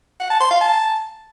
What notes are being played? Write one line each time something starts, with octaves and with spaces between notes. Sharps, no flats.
F#5
A5
C6
F5
A5